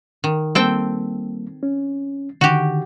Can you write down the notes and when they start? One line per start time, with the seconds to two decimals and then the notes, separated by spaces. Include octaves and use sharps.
0.24 D#3
0.55 G3 A#3 C4 A4 G5
1.63 C#4
2.41 D3 D#3 F#4 G4